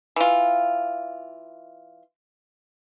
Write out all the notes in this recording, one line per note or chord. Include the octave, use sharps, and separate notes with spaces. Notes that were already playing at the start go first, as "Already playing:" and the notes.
E3 F4